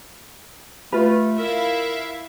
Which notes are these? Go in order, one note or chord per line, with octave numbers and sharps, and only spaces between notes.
A3 F4 B4
E4 A#4 E5 F5